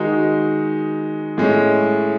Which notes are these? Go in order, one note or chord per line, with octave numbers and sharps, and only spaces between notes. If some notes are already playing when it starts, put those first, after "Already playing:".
Already playing: D#3 G#3 D#4 F#4
A2 G#3 C#4